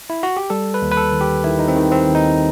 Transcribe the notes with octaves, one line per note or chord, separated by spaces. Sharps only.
E4
F#4
G4
G3 A4
B4
D#2
B4
A4
D#3
G4
D#3 E4
D#4
C4
D#3
C4
D#2
D#4